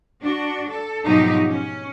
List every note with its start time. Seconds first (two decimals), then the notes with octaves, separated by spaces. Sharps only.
0.21 D4 F#4
0.67 A4
1.06 G#2 B2 F3 F#3 D#4 G4
1.47 C#4